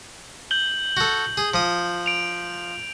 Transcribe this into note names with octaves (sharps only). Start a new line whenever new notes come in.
G6 F#7 G7
F#4 A4
G#4
F3 D#6
D7 F7